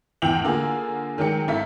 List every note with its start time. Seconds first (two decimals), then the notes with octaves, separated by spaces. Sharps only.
0.22 E2 A2 G5 F7 F#7
0.44 D3 A#3 F4 G#4
1.18 D#3 F#3 G#3 G5 C#7
1.48 G#1 E4 A4 F5 A#5 B6